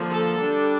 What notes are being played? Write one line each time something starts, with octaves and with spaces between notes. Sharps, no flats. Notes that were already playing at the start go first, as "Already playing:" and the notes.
Already playing: D3 F3 A#3
A4
G3 D4